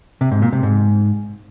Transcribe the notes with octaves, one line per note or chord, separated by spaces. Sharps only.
C3
G#2
A#2
C3
G#2